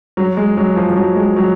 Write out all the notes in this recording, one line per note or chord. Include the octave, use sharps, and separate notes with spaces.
F#3
G#3
F#3
F3
F3
F#3
G#3
F#3